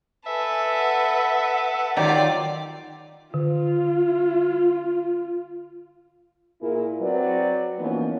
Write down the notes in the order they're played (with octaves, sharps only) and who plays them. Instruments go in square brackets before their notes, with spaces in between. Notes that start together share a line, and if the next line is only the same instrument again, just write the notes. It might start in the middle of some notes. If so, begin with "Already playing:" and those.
[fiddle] A4 B4 [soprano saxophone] E5 [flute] G#5
[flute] F#5
[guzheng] D#3 F#3 G4 [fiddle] F4 D5
[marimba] D3 [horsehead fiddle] F4
[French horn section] A#2 A#3 E4 F4 G#4 A#4
F#3 C4 F#4 B4 D5
E3 F3 A#3 B3 C#4 D#4